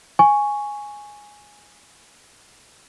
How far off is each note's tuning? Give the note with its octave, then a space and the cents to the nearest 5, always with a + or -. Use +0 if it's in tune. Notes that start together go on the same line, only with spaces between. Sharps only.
G#5 +0 C#6 +0